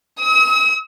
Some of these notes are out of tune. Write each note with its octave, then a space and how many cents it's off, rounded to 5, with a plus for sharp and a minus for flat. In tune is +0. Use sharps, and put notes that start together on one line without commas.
D#6 +45